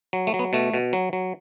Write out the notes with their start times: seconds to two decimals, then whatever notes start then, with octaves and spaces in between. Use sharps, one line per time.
0.13 F#3
0.27 A3
0.34 F#3
0.39 B3
0.53 B2 A3
0.74 B2
0.93 F#3
1.13 F#3